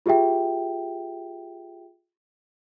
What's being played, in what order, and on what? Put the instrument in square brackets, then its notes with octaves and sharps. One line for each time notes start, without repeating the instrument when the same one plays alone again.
[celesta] F4 G4 G#4 E5 G5